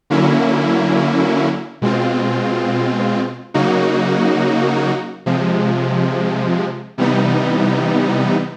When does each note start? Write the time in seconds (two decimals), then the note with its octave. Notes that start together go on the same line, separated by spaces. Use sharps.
0.10 D3 F#3 A#3 C#4 E4
1.82 B2 G#3 C4 F4
3.54 C#3 F#3 A#3 D#4 F#4
5.26 C3 F3 G#3
6.98 C3 E3 G3 B3 D#4